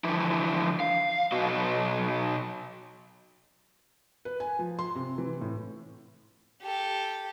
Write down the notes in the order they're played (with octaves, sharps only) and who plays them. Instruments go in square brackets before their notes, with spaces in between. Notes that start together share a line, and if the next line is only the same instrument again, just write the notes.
[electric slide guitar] D3 E3 F3 E4
F5
B2 F#3 F#4 D#5
[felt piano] B4
G#5
F3
C6
C3
E3
A2
[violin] G4 A4